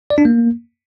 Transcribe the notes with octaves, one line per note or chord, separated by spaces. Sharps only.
D5
D4
A#3